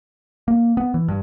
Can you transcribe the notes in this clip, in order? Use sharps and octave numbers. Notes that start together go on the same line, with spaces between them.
A#3
B3
E3
G2